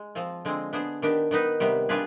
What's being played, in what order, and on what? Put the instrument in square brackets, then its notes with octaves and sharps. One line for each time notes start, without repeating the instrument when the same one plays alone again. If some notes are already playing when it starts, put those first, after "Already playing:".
Already playing: [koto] G#3
F3 C4 F4
D3 G#3 C4
B3 D4 G#4 C5
D#3 B3 D4 G4
D#3 B3 D#4 B4
C3 D#3 G3 B3
G3 D4 F4 G#4 B4